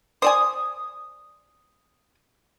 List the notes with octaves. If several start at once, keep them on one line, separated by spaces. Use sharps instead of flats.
C5 D5 G#5 D#6